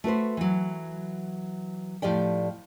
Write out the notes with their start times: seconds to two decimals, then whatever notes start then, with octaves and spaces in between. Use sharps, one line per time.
0.04 A3 F#4 B4 C5
0.37 E3 F#3
2.02 A2 F3 G4 D5 G5